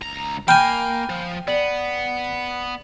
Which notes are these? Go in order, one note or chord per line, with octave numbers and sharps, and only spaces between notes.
C#2 A#5
A#3 G5 G#5 B5 F6 G6
F3
B3 D5 F#7